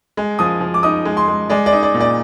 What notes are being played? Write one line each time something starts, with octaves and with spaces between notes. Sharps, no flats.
G#3
F3 D#6
F3
D6
D#4 D#6
G#3
C6
G#3
G#3 D5
D5
D#4
D5
A#2
D5